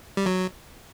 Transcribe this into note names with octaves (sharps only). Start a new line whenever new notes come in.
G3
F#3